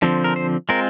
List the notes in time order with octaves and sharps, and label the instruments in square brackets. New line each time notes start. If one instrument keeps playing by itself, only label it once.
[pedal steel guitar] D3 F3 C4
A#4
C5
G#3 C4 F4 A#4